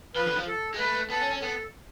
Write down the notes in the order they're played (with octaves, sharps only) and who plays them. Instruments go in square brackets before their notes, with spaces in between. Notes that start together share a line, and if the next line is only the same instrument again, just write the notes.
[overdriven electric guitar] F3 [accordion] B4
[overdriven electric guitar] D3
F3
[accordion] A4
[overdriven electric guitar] G#3
[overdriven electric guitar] A3 [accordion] B4
[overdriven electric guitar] B3 [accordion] A4
[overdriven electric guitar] C#4
C#4
[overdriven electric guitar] B3 [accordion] A4